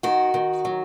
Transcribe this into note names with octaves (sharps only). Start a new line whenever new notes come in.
D#3 F#4
D#3
F#3